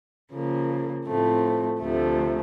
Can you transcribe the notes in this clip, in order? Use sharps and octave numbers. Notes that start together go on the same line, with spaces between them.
C#3 F3 A#3
A2 F3 A3 C4
D2 C3 F3 A3